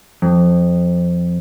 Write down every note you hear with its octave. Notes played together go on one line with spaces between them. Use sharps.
F2